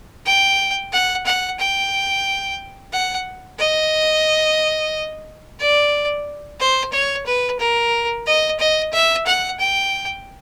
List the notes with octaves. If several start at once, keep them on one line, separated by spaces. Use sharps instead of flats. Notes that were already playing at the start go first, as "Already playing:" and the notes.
G5
F#5
F#5
G5
F#5
D#5
D5
C5
C#5
B4
A#4
D#5
D#5
E5
F#5
G5